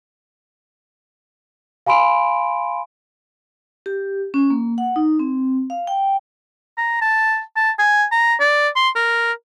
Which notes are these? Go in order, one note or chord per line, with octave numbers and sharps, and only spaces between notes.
F5 G#5 B5 C6 D7
G4
C#4
A#3
F#5
D#4
C4
F5
G5
A#5
A5
A5
G#5
A#5
D5
C6
A#4